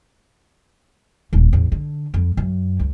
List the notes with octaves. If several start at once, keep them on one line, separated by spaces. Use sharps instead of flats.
D#1 A#1
A1 E2
D3
F2
F#2
C#2